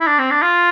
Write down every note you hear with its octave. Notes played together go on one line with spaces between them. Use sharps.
E4
D4
C4
D4
F4